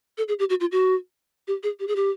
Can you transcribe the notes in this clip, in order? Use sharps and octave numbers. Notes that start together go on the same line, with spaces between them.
A4
G#4
G4
F#4
F4
F#4
G4
G#4
G4
G#4
G4